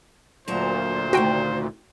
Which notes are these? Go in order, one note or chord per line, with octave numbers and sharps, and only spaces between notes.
D2 A#2 F#3 C5 A5 A#5
C3 D#3 A3 F#4 G5